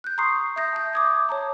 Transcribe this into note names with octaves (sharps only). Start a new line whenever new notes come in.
F#6 G6
A#5 C6 C#6 D#6 C7
E5 D#6 G6 A#6
A5 G6
D6 D#6 G#6
C#5 A5 A#5